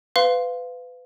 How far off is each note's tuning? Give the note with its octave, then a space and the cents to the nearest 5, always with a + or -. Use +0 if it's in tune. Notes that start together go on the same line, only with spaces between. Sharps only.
B4 +25 F5 +0 C6 +0